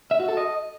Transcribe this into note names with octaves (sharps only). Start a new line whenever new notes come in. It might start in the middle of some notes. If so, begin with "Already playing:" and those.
E5
F#4
A4
D#5